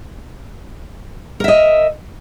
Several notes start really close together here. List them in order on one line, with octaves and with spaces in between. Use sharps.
A#4 E5 D#5